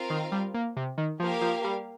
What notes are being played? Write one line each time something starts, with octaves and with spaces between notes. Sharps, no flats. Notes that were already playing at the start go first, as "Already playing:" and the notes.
Already playing: C4 F4 A#4 F5
D#3
G3
A#3
C3
D#3
F3 A#3 G4 A#4 F5
F3
G3